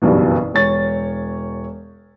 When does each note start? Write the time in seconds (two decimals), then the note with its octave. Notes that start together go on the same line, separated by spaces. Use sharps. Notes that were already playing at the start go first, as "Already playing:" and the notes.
0.02 F#1 B1 G2 B2 E3
0.54 E1 C#5 A6